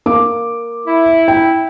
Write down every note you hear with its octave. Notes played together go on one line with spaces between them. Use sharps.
A#3 D6
E4
G5